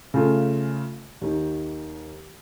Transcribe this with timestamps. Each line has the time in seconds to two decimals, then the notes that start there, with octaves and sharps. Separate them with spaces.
0.14 C#3 A3 C#4 F4 A4
1.22 D#2 D#3